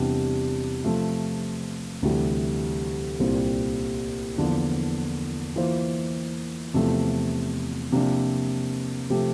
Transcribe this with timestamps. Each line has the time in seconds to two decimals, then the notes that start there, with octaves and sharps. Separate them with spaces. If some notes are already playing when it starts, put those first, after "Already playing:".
Already playing: E2 C3 G3 D4
0.84 C3 F3 A3
2.02 D2 C3 E3 G3
3.20 C2 A#2 G3 C4
4.38 E2 D3 F3 A#3 D4
5.56 E3 A#3 F4 C5
6.74 E2 C3 F3 A3
7.92 C3 F3 A#3 D4
9.10 C3 F3 A3 C4 G4